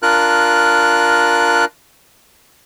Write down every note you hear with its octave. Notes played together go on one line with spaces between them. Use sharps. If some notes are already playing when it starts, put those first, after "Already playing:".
D4 F4 A#4 F#6